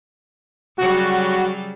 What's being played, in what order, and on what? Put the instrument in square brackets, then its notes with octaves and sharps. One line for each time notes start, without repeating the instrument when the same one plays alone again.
[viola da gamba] C#3 F#3 G3 [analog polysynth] F#4